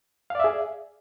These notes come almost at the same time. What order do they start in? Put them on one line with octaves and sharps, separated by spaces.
F5 D5 E5 G#4